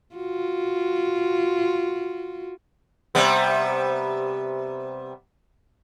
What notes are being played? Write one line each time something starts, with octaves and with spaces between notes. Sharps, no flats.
F4 F#4
C3 G3 B3